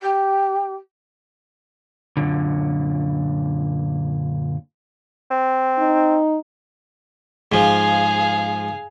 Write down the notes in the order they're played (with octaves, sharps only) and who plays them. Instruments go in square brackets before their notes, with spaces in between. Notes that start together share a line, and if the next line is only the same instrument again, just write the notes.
[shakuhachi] G4
[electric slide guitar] F#2 A#2 D3
[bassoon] C4
[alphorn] D#4
[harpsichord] G#2 F3 [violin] G#4 F5